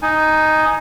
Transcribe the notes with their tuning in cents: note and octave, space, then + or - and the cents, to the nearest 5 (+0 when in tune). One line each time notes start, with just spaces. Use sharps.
D#4 +0 G#5 +10